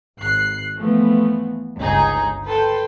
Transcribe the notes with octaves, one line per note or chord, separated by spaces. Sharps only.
G#1 F#6 C7
E3 F3 A3 B3
G1 C#2 D#4 G#4
A4 B4 G5 C6